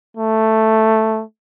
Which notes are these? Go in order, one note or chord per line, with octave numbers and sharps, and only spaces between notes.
A3